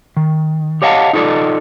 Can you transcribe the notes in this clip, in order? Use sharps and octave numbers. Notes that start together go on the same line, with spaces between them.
D#3
G4 C#5 D#5 F5 F#5 A5
D#4 F4 A4 A#4 D5 D#5